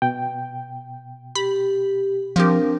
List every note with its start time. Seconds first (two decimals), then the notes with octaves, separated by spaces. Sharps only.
0.02 B2 G5
1.35 G4 B5
2.36 F3 C4 D4 G4 A#4